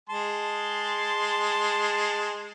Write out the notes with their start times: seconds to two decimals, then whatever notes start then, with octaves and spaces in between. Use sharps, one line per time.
0.09 G#3 A5 C6